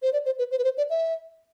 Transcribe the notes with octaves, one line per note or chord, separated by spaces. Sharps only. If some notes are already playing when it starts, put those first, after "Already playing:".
C5
D5
C5
B4
C5
B4
C5
D5
E5